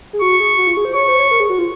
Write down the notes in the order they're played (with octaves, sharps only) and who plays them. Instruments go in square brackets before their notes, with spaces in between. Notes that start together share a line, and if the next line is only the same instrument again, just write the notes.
[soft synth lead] G#4
[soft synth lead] F#4 [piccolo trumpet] C#6
[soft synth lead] G#4
F#4
F4
G#4
C5
[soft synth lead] C#5 [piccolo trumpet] C#6
[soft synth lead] C5
C#5
A#4
G#4
F#4
F4